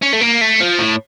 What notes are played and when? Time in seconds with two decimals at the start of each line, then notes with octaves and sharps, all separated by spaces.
0.02 C#4
0.13 A3
0.21 A#3
0.41 A3
0.61 F3
0.79 A2